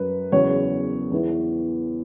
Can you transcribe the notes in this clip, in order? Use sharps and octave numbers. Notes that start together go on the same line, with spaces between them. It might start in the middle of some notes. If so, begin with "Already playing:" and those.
Already playing: F#2 F#3 B4
E2 C#3 F#3 C#5
E2 E3